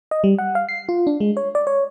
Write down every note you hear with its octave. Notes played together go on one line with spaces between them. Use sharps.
D#5
G3
F#5
F5
C7
F4
D4
G#3
C#5
D5
C#5